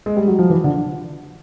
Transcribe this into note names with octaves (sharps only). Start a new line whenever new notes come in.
G#3
G3
F#3
F3
E3
D3